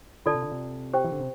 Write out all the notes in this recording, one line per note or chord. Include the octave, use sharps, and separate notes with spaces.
D3 F4 A4 D5 A5
C3
D3
C3
G4 C5 G5
E3
D3
C3